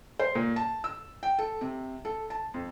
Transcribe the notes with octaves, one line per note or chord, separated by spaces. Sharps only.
C5
A#2
A5
E6
G5
A4
C3
A4
A5
F2